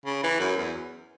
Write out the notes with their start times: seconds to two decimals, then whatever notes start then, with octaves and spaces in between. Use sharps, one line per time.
0.06 C#3
0.23 E3
0.40 F#2
0.57 E2